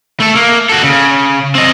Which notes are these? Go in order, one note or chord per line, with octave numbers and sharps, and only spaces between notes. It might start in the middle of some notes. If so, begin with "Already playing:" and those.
A3 A4
A#3
F#4 A4
C#3
C4 D#5